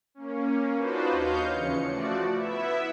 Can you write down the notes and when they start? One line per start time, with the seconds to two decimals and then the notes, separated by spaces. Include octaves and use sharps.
0.15 A#3 C#4
0.76 D4 D#4 F4 F#4 B4 C5
1.10 D#2 C#5 D#5 F5 G6
1.53 E2 C#3 E3 F3 C#4 C#7
1.85 F3 A3 F#4 D5
2.33 B3 E4 E5